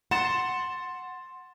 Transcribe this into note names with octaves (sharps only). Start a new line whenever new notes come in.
F#5 C6 A6 E7